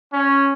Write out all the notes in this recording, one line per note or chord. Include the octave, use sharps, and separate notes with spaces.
C#4